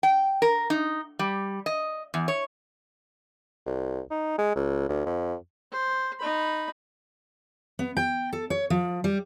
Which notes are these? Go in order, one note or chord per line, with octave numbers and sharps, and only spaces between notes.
G5
A#4
D#4
G3
D#5
E2
C#5
C2
D#4
G#3
C#2
D2
F2
C5
D#4 B5
B3
G5
A4
C#5
F3
G3